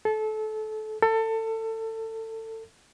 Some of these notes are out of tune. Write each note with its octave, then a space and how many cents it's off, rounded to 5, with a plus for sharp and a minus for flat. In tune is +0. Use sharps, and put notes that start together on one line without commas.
A4 -25
A4 +25